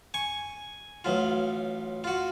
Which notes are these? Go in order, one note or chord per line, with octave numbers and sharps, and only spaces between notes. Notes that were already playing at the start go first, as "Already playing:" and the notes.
G#5 C#6
A1 F#3 F4
F4 F#4